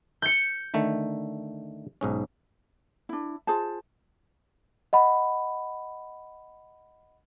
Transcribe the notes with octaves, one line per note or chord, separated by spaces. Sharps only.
G6 C#7
D3 D#3 A3
B1 G#2 C#4
D4 E4
F4 G#4 C5 A5
D#5 F#5 B5